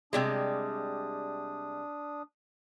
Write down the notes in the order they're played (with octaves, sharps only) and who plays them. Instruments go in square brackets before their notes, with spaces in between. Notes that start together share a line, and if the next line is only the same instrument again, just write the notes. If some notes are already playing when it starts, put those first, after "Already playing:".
[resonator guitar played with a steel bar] C3 G3 G#3 [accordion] D4 D#6